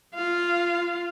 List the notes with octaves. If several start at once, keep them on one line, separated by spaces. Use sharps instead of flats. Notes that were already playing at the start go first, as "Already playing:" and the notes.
F4 F5